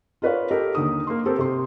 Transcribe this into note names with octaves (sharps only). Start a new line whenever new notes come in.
F4 A#4 B4 C#5 D5 F5
G4 A4 A#4 D#5
D#2 D3 D#4 D#6
A#3 C6
C4 G4 A4 A#4
C3 C6